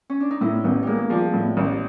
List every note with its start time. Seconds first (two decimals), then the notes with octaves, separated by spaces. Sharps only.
0.10 C#4
0.20 D4
0.31 D#4
0.41 A2 E4
0.64 A1 B3
0.83 G3 G#3 A#3
1.10 F3 G3
1.33 A2
1.57 A1